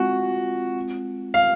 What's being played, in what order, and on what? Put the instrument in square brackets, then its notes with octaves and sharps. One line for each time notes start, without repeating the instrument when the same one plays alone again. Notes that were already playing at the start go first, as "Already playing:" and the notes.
Already playing: [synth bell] G#3 C4 F4 [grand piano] F#4
[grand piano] F5